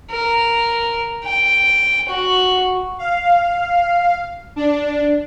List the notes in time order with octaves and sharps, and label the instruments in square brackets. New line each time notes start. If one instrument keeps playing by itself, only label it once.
[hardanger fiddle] A#4
G5
F#4
[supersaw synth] F5
D4